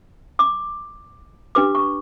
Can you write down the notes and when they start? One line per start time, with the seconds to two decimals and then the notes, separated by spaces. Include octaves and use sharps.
0.39 D6
1.55 D4 G4 B4 D6
1.75 C#6